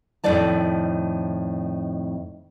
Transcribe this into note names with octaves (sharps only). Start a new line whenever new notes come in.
F2 A2 D#3 E4 D5 A5